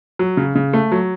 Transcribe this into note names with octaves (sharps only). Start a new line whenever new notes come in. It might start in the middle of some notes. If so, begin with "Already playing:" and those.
F#3
C#3
C#3
A3
F#3